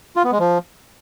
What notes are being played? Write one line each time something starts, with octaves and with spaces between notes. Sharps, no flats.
F4
B3
G#3
F3